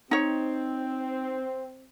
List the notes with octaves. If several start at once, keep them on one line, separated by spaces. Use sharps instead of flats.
C4 D#4 C#5